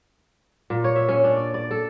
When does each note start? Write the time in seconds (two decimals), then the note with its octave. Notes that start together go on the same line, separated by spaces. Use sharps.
0.70 A#2
0.84 C#5
0.96 E5
1.09 C#4
1.24 D4
1.36 D5
1.54 D5
1.71 A4